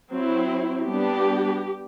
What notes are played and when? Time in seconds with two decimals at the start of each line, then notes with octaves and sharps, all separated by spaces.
0.13 F#3 C4 E4
0.88 G3 B3 D4 G4